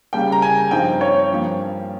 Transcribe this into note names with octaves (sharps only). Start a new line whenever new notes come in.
C#3 G3 A#3 G5
A#5
G#5
G2 F3 C4 D#4 G5
C#5
G2 F3 A#3